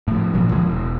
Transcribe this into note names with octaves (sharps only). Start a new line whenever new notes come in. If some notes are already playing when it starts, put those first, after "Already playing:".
A2 F3
G#1 A#2 F3 F#3
C#2 D3 F3 G#3
E1